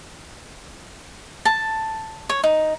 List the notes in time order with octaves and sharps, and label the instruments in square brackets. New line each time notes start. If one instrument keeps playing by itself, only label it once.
[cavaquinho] A5
C#5
D#4